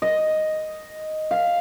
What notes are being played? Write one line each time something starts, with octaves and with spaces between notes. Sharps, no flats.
D#5
F5